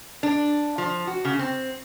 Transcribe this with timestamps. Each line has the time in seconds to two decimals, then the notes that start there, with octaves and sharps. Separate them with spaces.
0.23 D4
0.78 F3
1.07 F#4
1.25 C#3
1.39 C4